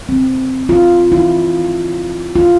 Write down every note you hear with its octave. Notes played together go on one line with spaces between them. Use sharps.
C4
F4
E4
F4